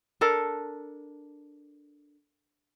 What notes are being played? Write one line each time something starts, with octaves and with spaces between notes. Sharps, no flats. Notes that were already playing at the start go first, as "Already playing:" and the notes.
D4 A4 A#4